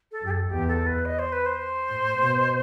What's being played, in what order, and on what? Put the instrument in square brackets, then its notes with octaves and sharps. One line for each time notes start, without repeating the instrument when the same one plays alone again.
[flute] A4
[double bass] F#2 [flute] G4
[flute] A4
[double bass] E2 [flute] G4
[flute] A4
B4
D#5
C5
B4
C5
[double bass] A2
B2